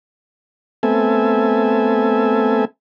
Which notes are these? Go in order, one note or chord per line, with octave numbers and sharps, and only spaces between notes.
A3 B3 C4 A4 E5 G#5